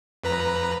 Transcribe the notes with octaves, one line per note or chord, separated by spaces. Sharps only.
F2 B4 A#5